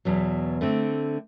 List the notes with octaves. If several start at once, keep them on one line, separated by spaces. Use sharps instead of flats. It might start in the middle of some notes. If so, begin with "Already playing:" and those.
E2 B2 F#3
D3 A3 C4